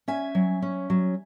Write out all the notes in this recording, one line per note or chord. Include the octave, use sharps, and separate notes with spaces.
C#4 E5 G#5
F#3
C#4
F#3